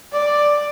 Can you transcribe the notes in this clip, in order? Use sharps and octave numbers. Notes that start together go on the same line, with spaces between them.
D5